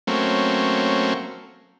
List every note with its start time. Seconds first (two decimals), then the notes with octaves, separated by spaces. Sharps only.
0.07 F#3 A3 A#3 C4 C#4